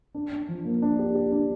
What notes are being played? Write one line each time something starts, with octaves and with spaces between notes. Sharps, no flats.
D4
D4
F3
A#3
D4
G4
G4
D4